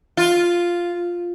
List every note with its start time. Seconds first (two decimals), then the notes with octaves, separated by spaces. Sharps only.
0.17 F4